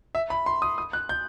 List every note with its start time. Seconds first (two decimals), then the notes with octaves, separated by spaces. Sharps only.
0.15 E5
0.30 B5
0.46 C6
0.62 D#6
0.78 D#6
0.93 F#6
1.09 G6